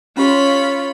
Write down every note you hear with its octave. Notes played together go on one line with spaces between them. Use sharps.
C#4 F4 G4 C#5 B5 C6